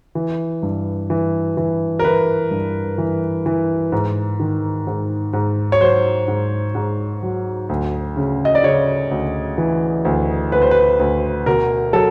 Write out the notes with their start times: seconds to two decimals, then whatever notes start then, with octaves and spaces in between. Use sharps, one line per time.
0.15 E3
0.63 G2
1.10 E3
1.57 E3
1.99 A#4
2.04 E3 B4
2.51 G2
2.98 E3
3.46 E3
3.92 G#2
4.40 D#3
4.87 G#2
5.33 G#2
5.72 C#5
5.81 F#3 C5
6.28 G#2
6.75 G#2
7.23 F#3
7.69 D2
8.17 C#3
8.45 D#5
8.55 D5
8.64 C#3 C#5
9.11 D2
9.58 E3
10.05 D2
10.52 D2 B4
10.62 C5
10.71 B4
10.99 D2
11.46 B2 A#4
11.93 F#3 A4